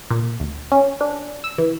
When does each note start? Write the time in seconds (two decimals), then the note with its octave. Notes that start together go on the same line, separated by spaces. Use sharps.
0.11 A#2
0.40 D2
0.72 C#4
1.01 D4
1.44 E6
1.58 E3